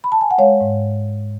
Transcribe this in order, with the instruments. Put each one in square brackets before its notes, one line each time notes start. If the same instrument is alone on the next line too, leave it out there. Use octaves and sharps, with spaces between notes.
[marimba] B5
A5
G#5
F#5
G#3 C#5 F5
G#2